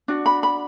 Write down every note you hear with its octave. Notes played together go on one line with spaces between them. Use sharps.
D4 F#4
B5
B5